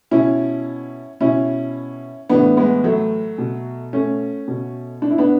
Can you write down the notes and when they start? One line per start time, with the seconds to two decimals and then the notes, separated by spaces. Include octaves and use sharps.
0.11 B2 C#4 E4
1.21 B2 C#4 E4
2.29 A2 E3 B3 D4
2.57 G#3 B3
2.84 F#3 A3
3.38 B2
3.93 A3 C#4
4.48 B2
5.02 D4
5.11 E4
5.18 B3 D4